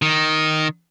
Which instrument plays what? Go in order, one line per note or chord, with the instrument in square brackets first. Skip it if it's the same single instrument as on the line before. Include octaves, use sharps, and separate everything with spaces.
[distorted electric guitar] D#3